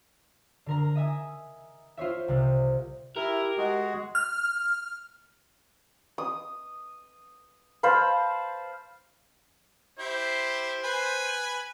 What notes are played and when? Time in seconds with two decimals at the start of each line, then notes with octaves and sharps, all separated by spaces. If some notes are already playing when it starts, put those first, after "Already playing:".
0.66 D3 A#4 A#5
0.95 D#5 E5 G#5 D#6
1.97 F4 C5 C#5 E5
2.28 C2 C3
3.16 E4 G4 A#4
3.58 G#3 F#4 G#4
4.15 F6
6.18 D#6
7.83 C5 F5 A5 B5
9.99 E4 G4 C5
10.84 B4 G#5 B5